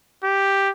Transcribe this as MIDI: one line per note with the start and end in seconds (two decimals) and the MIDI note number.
0.24 0.69 67